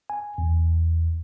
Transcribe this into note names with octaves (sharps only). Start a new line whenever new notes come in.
G#5
E2